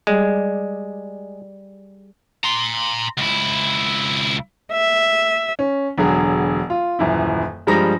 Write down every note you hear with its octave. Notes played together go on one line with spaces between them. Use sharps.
G3 G#3 G#4 D5
A#5 C6
C#2 E4
E5
C#4
E1 D3 F#3 G#4
F4
D#1 F#2 E3 E4
G2 F3 G3 G#3 A#5 A#6